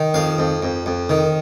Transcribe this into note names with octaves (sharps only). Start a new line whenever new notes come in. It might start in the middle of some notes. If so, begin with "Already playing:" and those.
Already playing: D#3
F2 F5
F2
F2
F2
D#3